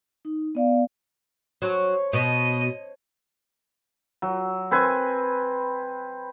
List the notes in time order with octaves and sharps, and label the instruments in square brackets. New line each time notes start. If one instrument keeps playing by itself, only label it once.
[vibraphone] D#4
B3 D5 F5
[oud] F#3 [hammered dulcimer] C5 C#5 A5
[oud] B2 [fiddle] D#5
[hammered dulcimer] F#3
C4 B4 G#5